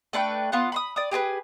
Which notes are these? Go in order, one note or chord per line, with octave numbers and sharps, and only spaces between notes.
A3 D4 B4 G5
B3 F4 F#5
B5 C6 D#6
D5 D#6
G4 G#4 A#4 B4